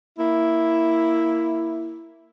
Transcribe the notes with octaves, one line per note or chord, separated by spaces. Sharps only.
A#3 E4